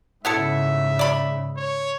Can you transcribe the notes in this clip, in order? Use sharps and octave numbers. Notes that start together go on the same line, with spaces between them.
G#2 C#3 B3 E4 A4 E5
D5 B5
C#5